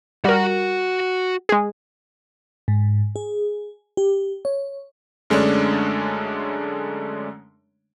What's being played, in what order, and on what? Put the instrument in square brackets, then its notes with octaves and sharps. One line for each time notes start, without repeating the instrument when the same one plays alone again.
[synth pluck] G3 A#4 [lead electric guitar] F#4 F#5
[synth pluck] G#3 G#4
[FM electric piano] G#2
G#4
G4
C#5
[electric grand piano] F#2 D3 G#3 A3 C#4 D4